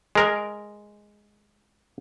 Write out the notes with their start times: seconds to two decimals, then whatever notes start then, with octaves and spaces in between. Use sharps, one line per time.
0.15 G#3 A#4